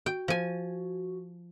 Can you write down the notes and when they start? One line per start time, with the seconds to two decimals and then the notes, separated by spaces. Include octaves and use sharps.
0.06 F#4 G5
0.28 F3 G#5